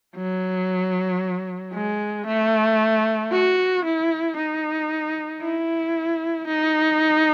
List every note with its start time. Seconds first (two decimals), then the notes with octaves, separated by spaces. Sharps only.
0.16 F#3
1.73 G#3
2.27 A3
3.32 F#4
3.85 E4
4.37 D#4
5.42 E4
6.47 D#4